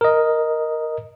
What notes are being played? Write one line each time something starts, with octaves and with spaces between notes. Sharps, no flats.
A#4 D#5